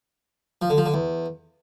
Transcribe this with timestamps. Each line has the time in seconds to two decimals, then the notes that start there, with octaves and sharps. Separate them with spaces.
0.62 F3
0.70 D3
0.78 F3
0.86 D3
0.94 E2